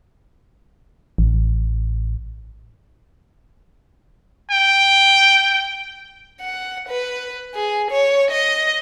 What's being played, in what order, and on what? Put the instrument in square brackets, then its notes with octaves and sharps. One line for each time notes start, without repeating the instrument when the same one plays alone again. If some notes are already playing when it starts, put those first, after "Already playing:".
[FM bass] A1
[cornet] G5
[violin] F#5
B4
G#4
C#5
D#5